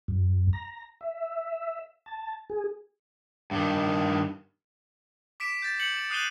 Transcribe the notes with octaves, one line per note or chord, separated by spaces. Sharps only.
F#2
A#5
E5
A5
G#4
G2 D#3
D6 B6 D7 E7
G6 A6
G6 C#7 F#7
E7
D#6 F#6 C7 D#7 E7 G7